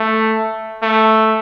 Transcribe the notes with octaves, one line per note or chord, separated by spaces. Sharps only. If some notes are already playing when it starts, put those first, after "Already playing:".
Already playing: A3
A3